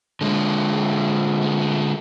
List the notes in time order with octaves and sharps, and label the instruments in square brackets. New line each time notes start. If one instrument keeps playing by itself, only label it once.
[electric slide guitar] D3 G#3